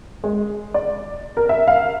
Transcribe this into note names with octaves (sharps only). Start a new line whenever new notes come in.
G#3
D5
A#4
E5
F5